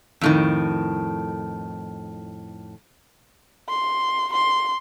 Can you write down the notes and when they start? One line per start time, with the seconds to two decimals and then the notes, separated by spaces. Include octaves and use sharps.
0.21 F2 A2 D#3
3.69 C6
4.33 C6